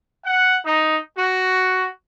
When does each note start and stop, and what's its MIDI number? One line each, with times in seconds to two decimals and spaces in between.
0.25 0.57 78
0.64 0.98 63
1.18 1.88 66